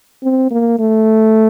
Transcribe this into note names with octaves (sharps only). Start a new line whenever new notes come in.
C4
A#3
A3